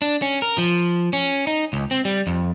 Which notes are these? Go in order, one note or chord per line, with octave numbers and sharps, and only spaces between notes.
D4
C#4
A#4
F3
C#4
D#4
C#2
C4
G3
F2